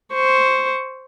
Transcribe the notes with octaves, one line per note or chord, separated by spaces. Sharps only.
C5 C#6